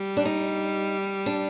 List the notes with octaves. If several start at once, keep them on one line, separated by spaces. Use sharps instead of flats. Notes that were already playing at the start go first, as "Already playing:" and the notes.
Already playing: G3
D4
D#4
D4